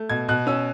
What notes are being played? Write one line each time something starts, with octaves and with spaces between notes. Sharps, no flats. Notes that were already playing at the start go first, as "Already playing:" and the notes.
Already playing: A3
B2 G#6
B2 F#6
C#4 E6